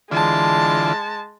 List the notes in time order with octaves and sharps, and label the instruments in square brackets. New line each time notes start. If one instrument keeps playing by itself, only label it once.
[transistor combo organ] D3 E3 F4 [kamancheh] G#3 A5